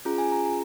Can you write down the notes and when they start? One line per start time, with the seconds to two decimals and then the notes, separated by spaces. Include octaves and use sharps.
0.05 C#4 F4 G#4 A#5
0.18 G#5
0.32 A#5
0.46 A#5